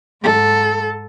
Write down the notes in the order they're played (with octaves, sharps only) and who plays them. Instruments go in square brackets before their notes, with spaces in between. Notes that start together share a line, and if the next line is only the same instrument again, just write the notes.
[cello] G#2 A4